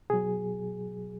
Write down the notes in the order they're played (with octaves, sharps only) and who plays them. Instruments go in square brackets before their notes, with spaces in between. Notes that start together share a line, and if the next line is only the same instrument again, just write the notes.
[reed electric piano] B2 F#3 G#4